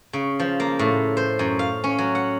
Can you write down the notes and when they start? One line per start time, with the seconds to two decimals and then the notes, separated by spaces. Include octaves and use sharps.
0.13 C#3
0.40 F3
0.60 A#3
0.79 A2
1.17 C5
1.39 F#2
1.59 F5
1.84 C#4
1.99 F#3
2.15 F#5